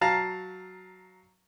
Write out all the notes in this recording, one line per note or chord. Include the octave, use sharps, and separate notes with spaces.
F#3 F5 A5 A#5 F6